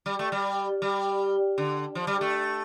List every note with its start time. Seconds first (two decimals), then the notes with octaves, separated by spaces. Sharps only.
0.06 G3
0.19 A3
0.32 G3
0.82 G3
1.58 D3
1.95 F3
2.07 G3
2.21 A3